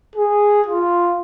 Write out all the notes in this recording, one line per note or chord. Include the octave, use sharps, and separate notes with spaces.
G#4
F4